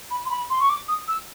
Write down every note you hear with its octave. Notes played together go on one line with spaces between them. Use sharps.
B5
C6
B5
C6
C#6
D6
D#6
E6